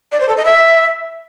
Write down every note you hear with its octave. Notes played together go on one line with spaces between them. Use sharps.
D5
C5
A4
D#5
E5